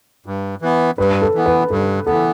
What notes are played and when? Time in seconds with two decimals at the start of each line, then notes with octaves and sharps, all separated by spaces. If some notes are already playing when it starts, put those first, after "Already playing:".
0.26 G2
0.62 E3 B3
0.98 G2 B4
1.22 A4
1.35 E3 B3
1.46 B4
1.70 G2 A4
2.06 E3 B3 A4